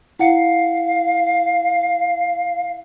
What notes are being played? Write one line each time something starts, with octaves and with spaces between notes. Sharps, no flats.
E4 F5 F#5 C#7